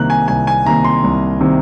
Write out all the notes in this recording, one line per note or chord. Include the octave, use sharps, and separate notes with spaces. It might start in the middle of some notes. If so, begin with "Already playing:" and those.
Already playing: C2 C3 D#3 A#3 F#6
G#5
C2 G#5
G#5
C3 D#3 A#3 A#5
C6
C2
C3 D#3 A#3